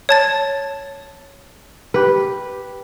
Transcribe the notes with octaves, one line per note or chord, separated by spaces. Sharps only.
C#5 A5 A6
G4 B4